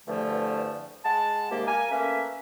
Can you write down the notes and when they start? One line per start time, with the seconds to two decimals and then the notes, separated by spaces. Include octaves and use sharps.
0.08 E2 G2 D3 F3 A3
1.05 G#3 F#5 A5
1.51 C3 D#3 G#3 A#3 G4
1.68 A#4 F5 G#5
1.91 A3 A#3 C#4 B4 E5